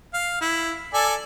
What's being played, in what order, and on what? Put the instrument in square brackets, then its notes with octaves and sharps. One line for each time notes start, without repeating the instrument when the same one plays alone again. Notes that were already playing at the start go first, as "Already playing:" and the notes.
[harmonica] F5
E4
A4 D5 G#5